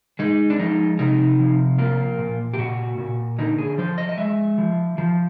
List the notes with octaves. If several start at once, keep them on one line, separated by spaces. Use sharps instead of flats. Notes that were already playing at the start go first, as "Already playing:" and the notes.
G#3 D#4
D4
F3 D#4
C3 D#4
F3
A#3 F4
A#2
G4
A#2 F#4
A#2
D3 D#4
G#4
F3 C5
D#5
D#5
G#3 E5
F3
F3